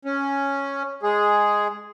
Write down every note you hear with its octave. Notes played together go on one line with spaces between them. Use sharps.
C#4
G#3 G#4